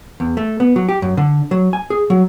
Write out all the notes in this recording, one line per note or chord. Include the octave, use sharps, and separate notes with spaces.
E2
A3
B3
F#3
G4
F#2
D3
F#3
G#5
G#4
F#3